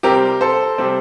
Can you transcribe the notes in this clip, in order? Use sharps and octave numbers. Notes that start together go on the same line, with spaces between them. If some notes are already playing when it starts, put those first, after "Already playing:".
C3 G3 C4 G4 A#4
A4 C5
C3 G3 C4